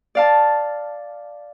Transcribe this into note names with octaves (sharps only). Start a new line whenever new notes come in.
D5 F5 A5